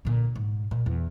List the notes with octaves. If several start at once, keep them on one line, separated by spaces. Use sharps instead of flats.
A#2 D3
G#2
A#2
E2